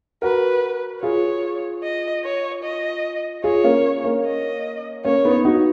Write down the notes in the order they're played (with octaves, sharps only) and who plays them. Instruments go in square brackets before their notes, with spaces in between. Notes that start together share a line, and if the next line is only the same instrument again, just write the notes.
[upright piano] F#4 A#4 [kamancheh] B4
[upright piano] F4 G#4 [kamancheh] C#5
[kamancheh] D#5
C#5
D#5
[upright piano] F4 G#4 [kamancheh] C#5
[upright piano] A#3 C#4
A#3 C#4
[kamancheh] D#5
[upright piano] A#3 C#4 [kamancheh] C#5
[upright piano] B3 D#4
D#4 F#4